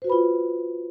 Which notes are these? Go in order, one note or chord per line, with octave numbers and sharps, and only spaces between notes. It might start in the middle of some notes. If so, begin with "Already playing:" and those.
F4 F#4 B4 C5 B5